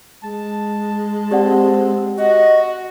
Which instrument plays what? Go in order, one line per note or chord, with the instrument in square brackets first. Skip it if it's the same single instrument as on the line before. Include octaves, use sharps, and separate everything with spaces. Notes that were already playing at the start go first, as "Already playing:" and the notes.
[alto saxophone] G#3 [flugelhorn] A5
[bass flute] C4 [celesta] G4 D5 F#5
[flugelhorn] F#4 [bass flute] D#5